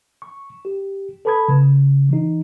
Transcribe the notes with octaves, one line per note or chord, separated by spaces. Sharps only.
C#6
G4
A4 B4 A5 B5 D#6 G#6
C#3
E3 D#4